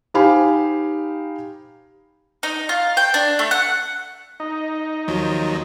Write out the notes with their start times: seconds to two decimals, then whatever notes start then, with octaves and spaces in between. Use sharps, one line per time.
0.14 D#4 G4 C5 F5 G#5 B5
2.43 D#4
2.69 F4
2.97 G5
3.14 D4
3.39 A3
3.51 F#5
4.40 D#4
5.08 D#2 F3 F#3